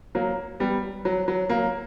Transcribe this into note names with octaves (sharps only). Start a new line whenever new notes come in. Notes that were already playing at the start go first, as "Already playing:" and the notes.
F#3 A#3
G3 B3
F#3
F#3
F#3 A#3